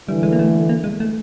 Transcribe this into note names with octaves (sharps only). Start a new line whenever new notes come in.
D3 E3 G3
G#3
A#3
A3
A#3
G#3
A3